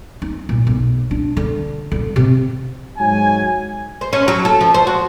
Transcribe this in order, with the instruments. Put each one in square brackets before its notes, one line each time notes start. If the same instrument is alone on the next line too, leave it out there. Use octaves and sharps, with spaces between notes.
[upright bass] D#4
A#2
B1
D4
D3
D3
C3
[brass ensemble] G#2 F#3 G#5
[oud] C5
C#4
F#3
A4
F3
C5
F#4